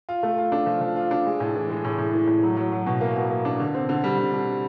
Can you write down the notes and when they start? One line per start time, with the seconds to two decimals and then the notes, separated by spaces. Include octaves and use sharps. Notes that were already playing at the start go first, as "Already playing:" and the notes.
0.09 F4
0.23 A3
0.38 F4
0.52 D4
0.66 F3
0.81 F3
0.96 F4
1.11 D4
1.26 G#3
1.40 A2
1.55 E3
1.70 G#3
1.85 A2
1.98 A2
2.13 E3
2.27 A2
2.43 F#3
2.57 F#3
2.72 F#3
2.86 B2
3.01 A#3
3.16 B2
3.30 A#3
3.45 D4
3.60 D3
3.75 C4
3.89 D3
4.04 G3
4.18 D3
4.34 D3